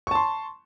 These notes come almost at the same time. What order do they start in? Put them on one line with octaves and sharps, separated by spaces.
C#6 A5 C6